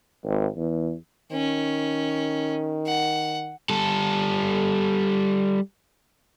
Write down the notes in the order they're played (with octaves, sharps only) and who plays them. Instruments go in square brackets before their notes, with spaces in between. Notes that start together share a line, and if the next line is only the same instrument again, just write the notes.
[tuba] G#1
E2
[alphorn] D#3 [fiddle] C#4
[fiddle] F#5
[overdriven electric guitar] G3 A4